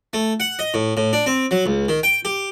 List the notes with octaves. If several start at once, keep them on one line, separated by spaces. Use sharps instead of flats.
A3
F#5
D#5
A2
A2
D4
C4
F#3
C#2
D#3
G5
G4